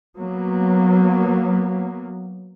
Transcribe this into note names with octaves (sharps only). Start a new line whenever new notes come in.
F#3 A#3 B3